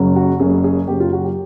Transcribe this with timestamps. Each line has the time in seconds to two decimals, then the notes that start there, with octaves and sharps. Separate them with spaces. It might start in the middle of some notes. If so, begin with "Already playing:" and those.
Already playing: F#1 F#2 C#3 F#3
0.16 F#4
0.40 F#1 F#2 C#3 F#3 G#4
0.64 G#4
0.88 F#1 F#2 C#3 F#3 G4
1.00 F4
1.12 F#4
1.24 G4